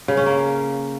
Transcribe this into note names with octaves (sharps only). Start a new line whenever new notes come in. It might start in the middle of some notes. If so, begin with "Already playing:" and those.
C#3
C#4
A#3